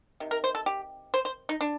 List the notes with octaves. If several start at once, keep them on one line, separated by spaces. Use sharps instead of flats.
C3 D#3
A#4
C5
A4
G4
C5
C5
D#4
D4